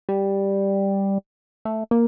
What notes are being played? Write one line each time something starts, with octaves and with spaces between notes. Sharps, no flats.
G3
A3
A#3